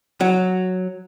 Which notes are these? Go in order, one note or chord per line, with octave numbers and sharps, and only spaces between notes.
F#3